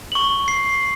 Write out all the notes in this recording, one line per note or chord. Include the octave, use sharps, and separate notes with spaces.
C#6 F#7
C7